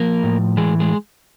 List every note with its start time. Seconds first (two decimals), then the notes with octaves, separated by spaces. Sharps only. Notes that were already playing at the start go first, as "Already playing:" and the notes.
Already playing: F3 A#3 A#4
0.23 A2
0.57 E3 G#3 G#4
0.80 G#3 G#4